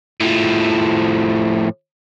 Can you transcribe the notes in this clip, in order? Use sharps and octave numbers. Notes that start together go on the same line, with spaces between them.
A2 F3